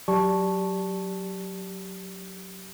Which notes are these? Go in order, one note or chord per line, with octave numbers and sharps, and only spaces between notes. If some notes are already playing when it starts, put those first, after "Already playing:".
F#3 G4 D5 A5 C#6